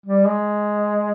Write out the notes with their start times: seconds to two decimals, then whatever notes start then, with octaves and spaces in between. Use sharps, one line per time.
0.06 G3
0.27 G#3